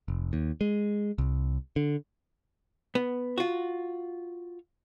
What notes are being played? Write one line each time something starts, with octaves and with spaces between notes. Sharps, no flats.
F1
D#2
G#3
C2
D3
B3
F4 F#4